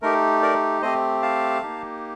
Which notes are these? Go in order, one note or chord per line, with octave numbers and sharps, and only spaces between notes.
A3 D#4 G4 A#4
A#4 D5
A3 C4 G4 C5 D#5
F5 A5
A#3 D#4 G4